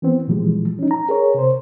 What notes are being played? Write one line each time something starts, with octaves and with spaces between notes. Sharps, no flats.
E3 B3 C4
A#2 E3 F3 G3 G#3
C#4 D#4
A#5
G#4 A#4 C#5
C3 C5